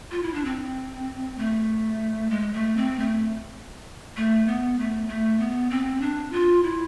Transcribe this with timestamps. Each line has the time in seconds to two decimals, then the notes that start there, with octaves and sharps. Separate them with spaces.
0.11 F4
0.23 E4
0.34 D4
0.45 C4
1.38 A3
2.30 G#3
2.54 A3
2.77 C4
2.99 A3
4.17 A3
4.47 B3
4.78 A3
5.08 A3
5.39 B3
5.70 C4
6.01 D4
6.32 F4
6.63 E4